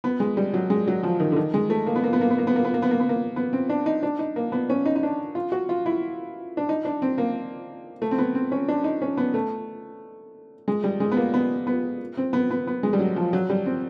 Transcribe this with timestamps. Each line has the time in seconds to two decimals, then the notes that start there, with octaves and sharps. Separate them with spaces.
0.04 B3
0.20 G#3
0.37 G3
0.54 F#3
0.70 G#3
0.88 F#3
1.03 F3
1.20 D#3
1.32 D3
1.36 D#3
1.54 G#3
1.70 A3
1.86 A#3
1.96 B3
2.04 A#3
2.13 B3
2.21 A#3
2.30 B3
2.38 A#3
2.47 B3
2.56 A#3
2.65 B3
2.74 A#3
2.82 B3
2.91 A#3
3.00 B3
3.09 A#3
3.36 B3
3.53 C4
3.69 D4
3.86 D#4
4.03 D4
4.19 D#4
4.36 A#3
4.52 B3
4.70 C#4
4.85 D#4
4.96 D#4
5.03 D4
5.35 F4
5.52 F#4
5.69 F4
5.86 E4
6.57 D4
6.69 D#4
6.85 D4
7.02 C4
7.18 A#3
8.02 A3
8.11 C4
8.18 B3
8.35 C4
8.52 C#4
8.68 D4
8.84 D#4
9.02 C#4
9.17 B3
9.34 A3
10.68 G#3
10.84 G3
11.00 G#3
11.11 B3
11.17 A#3
11.34 B3
11.67 B3
12.17 C4
12.33 B3
12.51 B3
12.67 B3
12.83 G#3
12.93 G3
12.99 F#3
13.16 F3
13.33 F#3
13.50 G3
13.66 C4